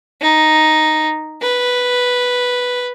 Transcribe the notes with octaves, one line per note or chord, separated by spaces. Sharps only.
D#4
B4